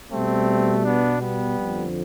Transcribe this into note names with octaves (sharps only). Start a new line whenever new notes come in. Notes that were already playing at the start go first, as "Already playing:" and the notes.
B2 G3 A3 C4
B3 D4
G3 B3
F2 D3 F3